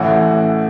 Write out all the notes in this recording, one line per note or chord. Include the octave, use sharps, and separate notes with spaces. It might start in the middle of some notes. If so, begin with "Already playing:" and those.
Already playing: A1 A2 E3 C#4 F#4